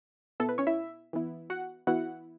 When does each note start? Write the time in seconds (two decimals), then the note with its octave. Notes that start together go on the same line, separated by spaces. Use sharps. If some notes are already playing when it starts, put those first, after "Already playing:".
0.40 B2 B3 E4 A4
0.49 B4
0.58 C#4 C#5
0.67 E4 E5
1.13 E3 B3 E4
1.50 F#4 F#5
1.87 E3 B3 E4 F#4 F#5